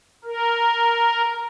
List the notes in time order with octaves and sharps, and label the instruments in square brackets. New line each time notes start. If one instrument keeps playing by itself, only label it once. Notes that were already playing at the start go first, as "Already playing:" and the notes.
[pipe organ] A#4